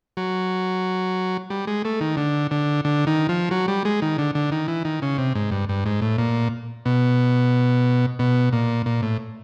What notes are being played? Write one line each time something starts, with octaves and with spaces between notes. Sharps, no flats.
F#3
G3
G#3
A3
D#3
D3
D3
D3
D#3
F3
F#3
G3
G#3
D#3
D3
D3
D#3
E3
D#3
C#3
C3
G#2
G2
G2
G#2
A2
A#2
B2
B2
A#2
A#2
A2